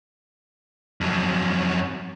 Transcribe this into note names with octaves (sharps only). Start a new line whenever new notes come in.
F2 F#3